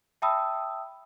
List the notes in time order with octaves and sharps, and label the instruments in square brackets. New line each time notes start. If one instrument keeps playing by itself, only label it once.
[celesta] E5 G5 A5 B5 D#6 E6